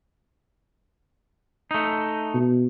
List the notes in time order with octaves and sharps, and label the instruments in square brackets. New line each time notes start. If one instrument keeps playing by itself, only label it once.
[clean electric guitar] A3 D#4
[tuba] B2